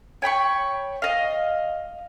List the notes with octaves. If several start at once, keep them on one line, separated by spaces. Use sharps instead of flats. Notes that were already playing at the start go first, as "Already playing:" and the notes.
C#5 G5 B5 C#6
D#5 F5